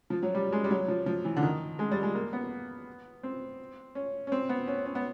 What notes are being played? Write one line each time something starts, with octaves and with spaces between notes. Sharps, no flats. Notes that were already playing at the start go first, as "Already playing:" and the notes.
F3
F#3
G3
G#3
G3
F#3
F3
F3
E3
D3
D#3
G#3
G3
G#3
A#3
B3
C4
C#4
C#4
C4
B3
C#4
C#4
B3